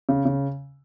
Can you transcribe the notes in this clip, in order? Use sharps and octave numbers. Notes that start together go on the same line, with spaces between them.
C#3
C#3